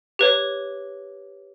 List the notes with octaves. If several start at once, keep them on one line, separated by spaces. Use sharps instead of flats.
G4 B4 C#5